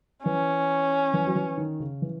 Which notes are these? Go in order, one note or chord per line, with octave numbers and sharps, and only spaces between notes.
E3 C#4
E3
F#3
E3
D#3
C#3
E3